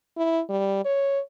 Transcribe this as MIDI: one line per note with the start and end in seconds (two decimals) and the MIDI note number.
0.17 0.41 64
0.49 0.81 55
0.85 1.20 73